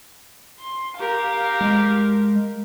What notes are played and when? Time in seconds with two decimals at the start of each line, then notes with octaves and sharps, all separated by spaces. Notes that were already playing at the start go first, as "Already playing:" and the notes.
0.60 C6
0.97 G4 A#4 F5
1.61 G#3